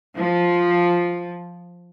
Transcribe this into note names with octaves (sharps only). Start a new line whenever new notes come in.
F3